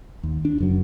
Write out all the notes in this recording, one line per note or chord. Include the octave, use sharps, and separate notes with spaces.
D#2
D4
F#1 F#2 F#3